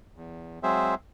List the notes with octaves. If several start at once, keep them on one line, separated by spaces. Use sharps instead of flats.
E2
F#3 G#3 C4 G#4 C5 E5